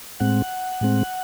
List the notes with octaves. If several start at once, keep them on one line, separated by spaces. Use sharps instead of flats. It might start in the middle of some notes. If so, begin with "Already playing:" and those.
A2 G#3 C4 F#5
A2 G#3 C4